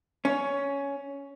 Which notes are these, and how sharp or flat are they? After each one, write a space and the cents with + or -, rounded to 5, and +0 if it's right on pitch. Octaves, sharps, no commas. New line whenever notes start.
C#4 +10